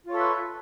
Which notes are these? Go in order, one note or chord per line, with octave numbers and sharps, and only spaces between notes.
F4 A4 B4 C#5 E5